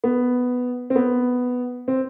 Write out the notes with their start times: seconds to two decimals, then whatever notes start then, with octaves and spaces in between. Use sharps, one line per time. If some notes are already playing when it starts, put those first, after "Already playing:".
0.04 B3
0.90 C4
0.96 B3
1.88 C4